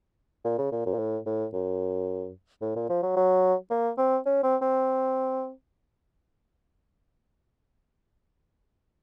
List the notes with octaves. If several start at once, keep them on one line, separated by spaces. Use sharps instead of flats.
A#2
C#3
A#2
F#2
A#2
A2
A2
F#2
A2
A#2
F3
F#3
F#3
A#3
C4
C#4
C4
C4